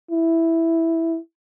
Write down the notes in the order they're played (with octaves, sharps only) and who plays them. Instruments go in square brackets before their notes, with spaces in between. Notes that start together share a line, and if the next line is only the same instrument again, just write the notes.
[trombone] E4